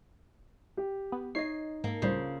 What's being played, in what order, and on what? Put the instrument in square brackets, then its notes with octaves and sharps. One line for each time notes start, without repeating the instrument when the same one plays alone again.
[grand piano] G4
[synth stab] B3
[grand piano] D#4 [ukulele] C#5 D#5 [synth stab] C7
[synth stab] G#2 [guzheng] A#3 A4
[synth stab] C#2 A2 G3 [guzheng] C#3 [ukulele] F4 C5